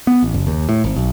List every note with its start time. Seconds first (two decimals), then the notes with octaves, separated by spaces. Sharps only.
0.07 B3
0.22 A1
0.34 F#1
0.47 D#2
0.69 A2
0.84 G#1
0.96 B1